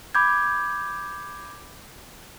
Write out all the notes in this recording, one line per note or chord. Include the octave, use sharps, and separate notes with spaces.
B5 D6 G6 G#6